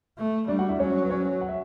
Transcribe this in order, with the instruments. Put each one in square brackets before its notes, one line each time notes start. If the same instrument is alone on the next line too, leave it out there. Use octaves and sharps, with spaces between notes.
[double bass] A3
[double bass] G3 [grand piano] D4 D5
[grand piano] F#4 F#5
E4 E5
[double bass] F#3 [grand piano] C#4 C#5
[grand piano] B4
C#4 C#5
F#5
E5